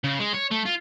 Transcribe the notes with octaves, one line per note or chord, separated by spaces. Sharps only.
C#3
G#3
C#5
A3
F4